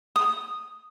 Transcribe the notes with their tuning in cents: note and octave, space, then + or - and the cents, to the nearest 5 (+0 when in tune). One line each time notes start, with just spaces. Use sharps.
D#6 -5